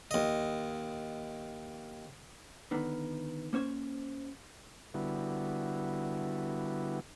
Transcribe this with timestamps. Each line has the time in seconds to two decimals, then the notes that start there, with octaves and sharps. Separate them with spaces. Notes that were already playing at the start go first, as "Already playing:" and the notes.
0.11 D#2 D#5
2.71 D3 D#3 B3
3.53 A#3 C#4 C5 C#5
4.94 D3 G3 B3 E4 F#4